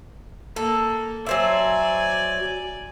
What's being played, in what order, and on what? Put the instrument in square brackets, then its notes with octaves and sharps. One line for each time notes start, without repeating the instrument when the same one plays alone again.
[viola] A#3 [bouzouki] A4
[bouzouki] F#3 C5 E5 [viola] D5 G#5